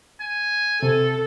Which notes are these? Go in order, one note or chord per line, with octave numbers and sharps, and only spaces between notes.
G#5
C3 A4